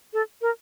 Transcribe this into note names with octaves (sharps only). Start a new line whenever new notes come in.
A4
A#4